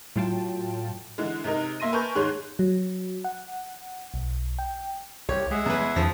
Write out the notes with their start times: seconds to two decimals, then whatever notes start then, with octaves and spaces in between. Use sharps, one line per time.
0.16 A2 F#3 F4 G5 A5
1.18 D3 E3 G#3
1.44 C3 G#3 D#4 A#4
1.80 A#3 E5 C6 A#6 D#7
1.92 A#4 B4 G#5 A5 C#6 G6
2.15 D#2 G#2 G#4 C#5 C6 F#6
2.59 F#3
3.24 F#5
4.14 B1
4.59 G5
5.29 C2 G4 C#5
5.51 G#3 G#4 E5 F#5
5.66 E2 B4
5.96 E2 F3